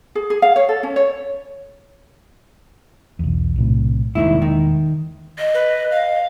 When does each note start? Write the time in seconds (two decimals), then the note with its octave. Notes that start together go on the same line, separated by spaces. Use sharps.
0.15 G#4
0.30 G#4
0.42 F5
0.56 C#5
0.69 A4
0.83 C#4
0.96 C#5
3.19 B1 E2
3.56 B1 A2 C3
4.15 E1 C2 D#3 G#3 A#3 E4
4.42 D#3
5.39 D#5
5.54 B4
5.91 F5